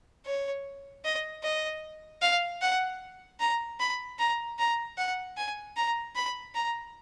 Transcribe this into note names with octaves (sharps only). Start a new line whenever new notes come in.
C#5
D#5
D#5
F5
F#5
A#5
B5
A#5
A#5
F#5
G#5
A#5
B5
A#5